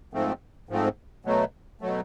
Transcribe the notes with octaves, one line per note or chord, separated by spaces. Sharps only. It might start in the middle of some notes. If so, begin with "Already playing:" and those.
G#2 F3 A3 C4
G#2 F3 A3 C4
B2 F#3 A3
B2 F#3 A3